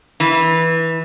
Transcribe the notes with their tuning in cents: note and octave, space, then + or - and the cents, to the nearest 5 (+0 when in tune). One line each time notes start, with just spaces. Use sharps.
E3 -15